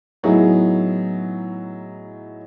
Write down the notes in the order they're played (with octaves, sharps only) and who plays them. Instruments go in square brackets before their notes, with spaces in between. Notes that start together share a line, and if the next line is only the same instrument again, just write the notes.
[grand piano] A2 F#3 B3 D#4 E4 G#4